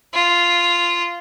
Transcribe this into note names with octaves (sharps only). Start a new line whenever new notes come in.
F4